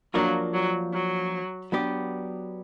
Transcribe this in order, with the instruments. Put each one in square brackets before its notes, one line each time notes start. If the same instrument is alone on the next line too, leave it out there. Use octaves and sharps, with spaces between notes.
[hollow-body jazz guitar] F3 A#3 D4 F4 A#4 [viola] F#3
[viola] F#3
F#3
[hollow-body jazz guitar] F#3 B3 D4 G4